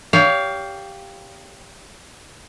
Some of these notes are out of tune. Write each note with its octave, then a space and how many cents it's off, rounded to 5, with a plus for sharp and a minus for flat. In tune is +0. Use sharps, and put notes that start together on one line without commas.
G4 +5 C#5 +35 F5 +0